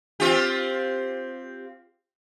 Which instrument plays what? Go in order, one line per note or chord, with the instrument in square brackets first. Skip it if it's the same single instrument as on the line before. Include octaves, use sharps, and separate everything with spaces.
[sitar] C4 F4 G4